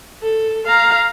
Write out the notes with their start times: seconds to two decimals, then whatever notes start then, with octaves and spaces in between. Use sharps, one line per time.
0.23 A4
0.67 F5 A#5